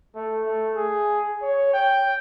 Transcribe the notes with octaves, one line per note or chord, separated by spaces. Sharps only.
A3
A3
G#4
C#5
G5